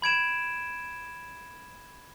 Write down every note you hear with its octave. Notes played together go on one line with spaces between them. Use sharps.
B5 G#6 D7 E7